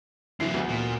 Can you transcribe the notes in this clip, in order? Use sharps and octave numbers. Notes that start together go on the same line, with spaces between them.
D3 E3 F#3 C7
D2 B3
A#2